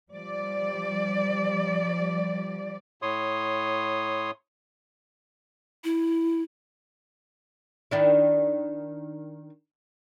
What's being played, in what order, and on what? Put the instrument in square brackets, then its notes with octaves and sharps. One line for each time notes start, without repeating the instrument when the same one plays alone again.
[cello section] F3 G3 D5
[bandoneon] A2 C#5 C6 D#6
[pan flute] E4
[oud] D#3 D4 E4